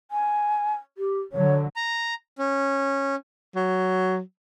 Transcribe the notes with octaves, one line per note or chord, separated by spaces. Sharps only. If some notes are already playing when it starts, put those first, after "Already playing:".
G#5
G4
D3 F#3 C#5
A#5
C#4
F#3